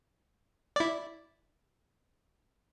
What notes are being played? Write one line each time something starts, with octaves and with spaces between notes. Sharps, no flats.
E4 D5